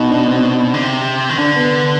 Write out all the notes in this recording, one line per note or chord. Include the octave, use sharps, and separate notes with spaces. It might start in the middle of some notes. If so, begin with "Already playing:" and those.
Already playing: B2 D#4
D4
C4
D3
C3
D#3
D3 D4
B3